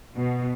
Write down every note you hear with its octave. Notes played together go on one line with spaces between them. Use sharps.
B2